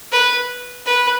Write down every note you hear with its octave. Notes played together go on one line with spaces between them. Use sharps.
B4
B4